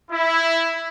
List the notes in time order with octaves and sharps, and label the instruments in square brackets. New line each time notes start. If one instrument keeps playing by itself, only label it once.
[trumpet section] E4